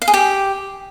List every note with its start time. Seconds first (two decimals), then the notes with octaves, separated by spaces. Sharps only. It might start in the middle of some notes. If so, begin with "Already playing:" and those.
0.02 F5
0.08 G#4
0.14 G4